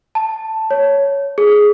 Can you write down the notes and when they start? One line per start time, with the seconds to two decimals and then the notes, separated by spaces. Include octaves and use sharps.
0.15 A5
0.71 C#5
1.38 G#4